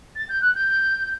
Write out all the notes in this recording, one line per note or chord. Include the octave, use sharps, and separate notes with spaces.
A6
G6
F#6
G6